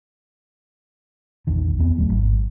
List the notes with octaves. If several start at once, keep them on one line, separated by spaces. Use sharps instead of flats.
A#1 E2 D#3
E2 B3 C4
D1 F#3 A3
G#1